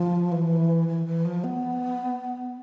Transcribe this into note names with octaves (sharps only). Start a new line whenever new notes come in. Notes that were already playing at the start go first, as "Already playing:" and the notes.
Already playing: F3
E3
E3
E3
F3
B3